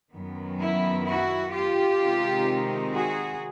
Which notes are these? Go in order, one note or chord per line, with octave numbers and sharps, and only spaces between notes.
F#2 D#3 F#3 B3
E4
E4 F#4
F4 G4
C3 D#3 G#3 C4 D#4
F#4 G#4